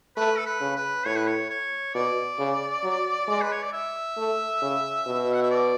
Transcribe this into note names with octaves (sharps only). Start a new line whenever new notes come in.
A3 B4
A4
B4
C#3
B4
A2 C#5
B4
C#5
C#5
B2 D5
C#3
F#3
G#3
B4
C#5
D5
E5
A3
C#3
B2
F#5
E5
D5